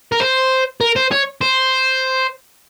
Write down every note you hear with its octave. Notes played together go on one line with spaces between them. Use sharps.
A#4
C5
A#4
C5
C#5
C5